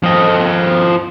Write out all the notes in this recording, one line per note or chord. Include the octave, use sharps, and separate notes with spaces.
F3 D#5